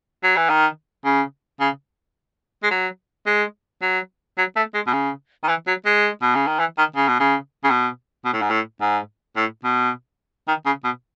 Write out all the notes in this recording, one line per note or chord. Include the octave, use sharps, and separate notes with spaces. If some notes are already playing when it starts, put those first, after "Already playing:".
F#3
E3
D#3
C#3
C#3
G#3
F#3
G#3
F#3
F#3
A3
G#3
B2
C#3
D#3
E3
F#3
G#3
B2
C#3
D#3
E3
D#3
C#3
B2
C#3
C#3
B2
B2
A2
G#2
A2
G#2
A2
B2
D#3
C#3
B2